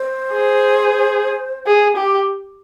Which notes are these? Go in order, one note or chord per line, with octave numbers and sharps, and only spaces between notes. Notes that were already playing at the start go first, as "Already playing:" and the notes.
Already playing: C5
G#4
G#4
G4